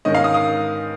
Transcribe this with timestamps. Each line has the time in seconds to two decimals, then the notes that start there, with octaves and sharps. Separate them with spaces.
0.05 G#2 D#3 C#4 D#5
0.15 F5
0.24 D#6
0.34 D#6